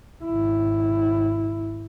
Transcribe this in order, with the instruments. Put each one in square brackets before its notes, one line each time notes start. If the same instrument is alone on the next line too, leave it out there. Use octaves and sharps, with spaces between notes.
[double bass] G#1 E4